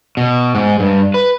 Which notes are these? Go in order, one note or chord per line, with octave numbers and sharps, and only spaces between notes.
B2
G#2
G2
B4